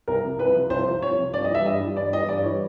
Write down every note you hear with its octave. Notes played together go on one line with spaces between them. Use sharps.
C2 A#4
C3 F3
C2 B4
C3 F3
C2 C5
C3 F3
C2 C#5
C3 F3
G2 D5
D#5
E3 G3 E5
G2 D#5
E3 G3
G2 D5
E3 G3 D#5
G2 D5
E3 G3 C#5